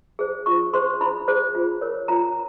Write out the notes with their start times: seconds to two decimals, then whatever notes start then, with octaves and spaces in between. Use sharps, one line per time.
0.19 G#4 C5
0.46 F4 C#6
0.73 G#4 C5 C6
1.01 E4 B5
1.28 G#4 C5
1.55 F4
1.81 A#4 C#5
2.08 F4 A#5